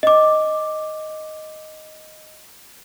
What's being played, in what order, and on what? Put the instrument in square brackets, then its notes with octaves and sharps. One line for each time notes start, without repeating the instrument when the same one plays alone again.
[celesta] D#5 D6